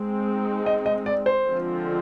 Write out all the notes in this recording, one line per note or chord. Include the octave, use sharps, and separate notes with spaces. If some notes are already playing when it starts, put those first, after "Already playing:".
Already playing: G#3 C4 D#4
D#5
D#5
D5
C5
D3 F3 G#3 C4 F4